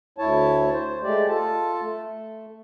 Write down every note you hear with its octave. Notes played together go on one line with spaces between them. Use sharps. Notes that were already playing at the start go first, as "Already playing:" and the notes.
D2 E4 C#5 A5
C5
G#3 A3 G4 D5
F4 A4 A5
A3